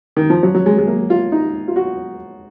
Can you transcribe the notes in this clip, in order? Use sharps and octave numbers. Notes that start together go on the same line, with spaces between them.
D#3
F3
F#3
F#3
G#3
G#3
A#3
F4
D#4
F4
F#4